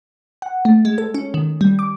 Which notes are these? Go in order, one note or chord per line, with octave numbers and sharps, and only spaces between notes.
F#5
A3
G#3
A4
C#4
D#3
G3
D6